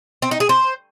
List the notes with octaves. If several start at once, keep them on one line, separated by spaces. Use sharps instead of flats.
C4
D#4
G#4
C5